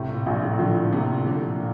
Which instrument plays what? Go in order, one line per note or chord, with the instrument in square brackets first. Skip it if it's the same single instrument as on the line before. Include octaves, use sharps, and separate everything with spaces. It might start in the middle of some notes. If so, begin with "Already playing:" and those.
Already playing: [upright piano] A2 [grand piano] C3
[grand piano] A#2
[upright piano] A#1 [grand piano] A#2
[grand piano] A2
[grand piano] D3 [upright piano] F3
[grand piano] D3
[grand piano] C3 [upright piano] A#3
[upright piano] A2 [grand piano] D3
[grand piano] A#2